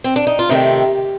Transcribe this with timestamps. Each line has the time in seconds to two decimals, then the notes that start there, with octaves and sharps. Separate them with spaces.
0.04 C4
0.16 D4
0.27 D#4
0.39 F4
0.49 C3 D#3 A3 C4 D#4 G4